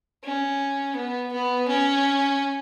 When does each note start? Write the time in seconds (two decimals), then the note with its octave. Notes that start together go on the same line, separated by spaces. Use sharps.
0.23 C#4
0.96 B3
1.32 B3
1.68 C#4